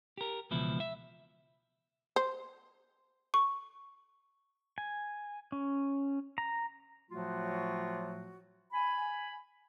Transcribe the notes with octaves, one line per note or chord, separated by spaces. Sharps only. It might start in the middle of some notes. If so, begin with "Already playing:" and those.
G4 A#4
C#2 B2 E3 F3 E4
E5
C5
C#6
G#5
C#4
A#5
A2 F3 F#3 A3 F4 F#4
G#5 B5